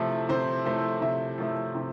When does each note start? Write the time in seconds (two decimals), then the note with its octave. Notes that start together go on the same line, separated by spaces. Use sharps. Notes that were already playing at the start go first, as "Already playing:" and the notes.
Already playing: C3 F3 A3 E4
0.29 C3 C5
0.65 F3 A3 E4 C5
1.01 C3 E5
1.38 F3 A3 E4
1.75 C3